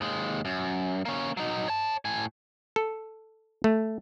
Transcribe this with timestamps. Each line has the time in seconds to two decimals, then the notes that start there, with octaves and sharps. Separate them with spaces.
0.01 D#2 G#3
0.45 F#2
1.05 A#3 C#4
1.37 F#3 D#4
1.68 C#5 A5
2.05 A2 G#5
2.76 A4
3.64 A3